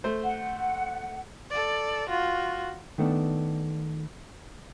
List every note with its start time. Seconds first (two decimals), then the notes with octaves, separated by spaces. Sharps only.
0.04 A3 C5
0.23 F#5
1.50 A4 D5
2.09 F4 F#4
2.98 D#3 A3 B3 D4